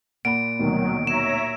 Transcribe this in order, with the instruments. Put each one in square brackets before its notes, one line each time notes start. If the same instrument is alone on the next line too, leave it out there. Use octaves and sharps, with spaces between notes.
[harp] A#2 [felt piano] F#5 B5 [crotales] D7
[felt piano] D2 B2 [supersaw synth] D#3 F#3
[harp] D#4 [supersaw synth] C#5 E5 A#5 [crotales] E7